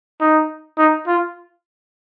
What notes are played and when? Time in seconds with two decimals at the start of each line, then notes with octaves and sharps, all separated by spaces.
0.20 D#4
0.78 D#4
1.07 F4